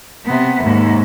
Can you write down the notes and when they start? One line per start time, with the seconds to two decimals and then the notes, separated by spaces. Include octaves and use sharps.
0.25 C3 B3
0.62 D#2 G#2